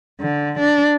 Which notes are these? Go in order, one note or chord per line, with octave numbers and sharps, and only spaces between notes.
D3
D4